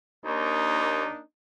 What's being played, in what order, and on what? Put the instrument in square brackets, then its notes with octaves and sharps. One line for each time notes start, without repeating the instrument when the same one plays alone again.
[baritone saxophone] D#2 [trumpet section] A#3 D4 D#4